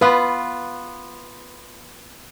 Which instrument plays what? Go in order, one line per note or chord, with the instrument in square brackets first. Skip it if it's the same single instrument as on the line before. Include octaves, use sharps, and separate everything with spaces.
[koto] B3 F4 [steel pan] B4